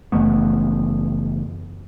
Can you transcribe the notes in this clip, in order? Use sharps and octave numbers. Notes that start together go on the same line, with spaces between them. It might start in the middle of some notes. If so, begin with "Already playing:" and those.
F#1 E3 A3 B3